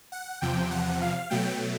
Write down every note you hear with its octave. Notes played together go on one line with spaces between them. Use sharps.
F#5
E2 C3 F3 G5
F#5
F5
B2 F#3 A3 G5